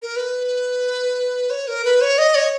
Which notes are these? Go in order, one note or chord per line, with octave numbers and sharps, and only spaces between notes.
A#4
B4
C#5
A#4
B4
C#5
D#5
C#5